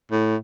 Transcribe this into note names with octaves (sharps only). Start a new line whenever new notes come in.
A2